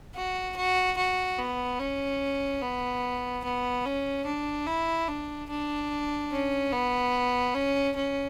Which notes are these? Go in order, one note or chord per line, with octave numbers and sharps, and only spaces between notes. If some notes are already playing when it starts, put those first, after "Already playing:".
F#4
F#4
F#4
B3
C#4
B3
B3
C#4
D4
E4
D4
D4
C#4
B3
C#4
C#4